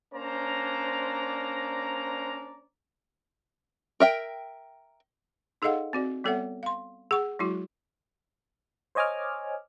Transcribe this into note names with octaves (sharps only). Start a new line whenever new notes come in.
A#3 C#4 D4 C5 D5 A#5
A#4 E5 G5
D#4 G#4 A4 D#5 F5 F#5
C4 F#4 D5
G3 B3 A4 C#5 E5 F#5
F5 C6
G#4 F#5 C#6
F#3 G#3 E4 F#4
C5 C#5 D#5 G#5 D6 F6